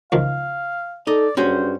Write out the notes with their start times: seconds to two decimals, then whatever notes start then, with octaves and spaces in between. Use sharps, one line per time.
0.12 C#2 D#3 F3 F5
1.07 D#4 A4 D5 D#5
1.37 G2 C#4 F#4 G#4 C5